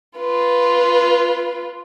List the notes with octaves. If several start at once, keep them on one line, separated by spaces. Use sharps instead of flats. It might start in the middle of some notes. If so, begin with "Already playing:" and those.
F4 B4